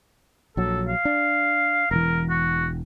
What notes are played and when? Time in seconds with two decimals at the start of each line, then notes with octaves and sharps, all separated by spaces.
0.57 A#1 F#3 A4
0.89 F5
1.05 D4
1.91 E1 E3 A#4
2.30 F#4